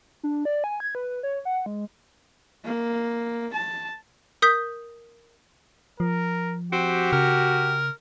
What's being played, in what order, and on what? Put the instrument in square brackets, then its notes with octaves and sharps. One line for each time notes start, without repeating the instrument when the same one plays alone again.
[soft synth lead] D4
D5
G#5
G#6
B4
C#5
F#5
G#3
[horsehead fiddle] A#3
A5
[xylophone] A#4 D#6 G6 B6
[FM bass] F3 [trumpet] A#4
[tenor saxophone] C4 [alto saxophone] F#4 [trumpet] G4
[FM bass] C#3 [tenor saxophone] A#4